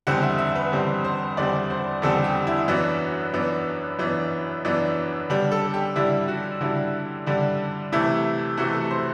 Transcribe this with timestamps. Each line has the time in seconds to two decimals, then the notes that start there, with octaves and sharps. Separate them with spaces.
0.07 E2 D3 G3 C4 F#5
0.23 E5
0.38 E5
0.55 B4
0.72 E2 D3 G3 C4
1.04 C5
1.37 E2 D3 G3 C4 D5
1.70 C5
2.02 E2 D3 G3 C4 A4
2.24 G4
2.47 E4
2.68 F#2 E3 B3 D4 F#4
3.34 F#2 E3 B3 D4
3.99 F#2 E3 B3 D4
4.65 F#2 E3 B3 D4
5.30 D3 G3 D4
5.52 A4
5.74 G4
5.96 D3 G3 D4 E4
6.28 F#4
6.61 D3 G3 D4 E4
7.26 D3 G3 D4
7.92 C3 E3 A3 E4
8.57 C3 E3 A3 F#4
8.75 A4
8.91 C5